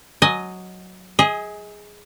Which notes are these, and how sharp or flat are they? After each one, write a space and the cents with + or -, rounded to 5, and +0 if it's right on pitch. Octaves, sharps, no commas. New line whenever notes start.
F#3 +0 D#5 +0 G#5 +10
G#4 +0 D#5 +35